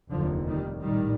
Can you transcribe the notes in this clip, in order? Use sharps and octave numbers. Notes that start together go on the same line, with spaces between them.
F1 D#2 D3 F3
D#3 G3
A#1 A2 D#3 G3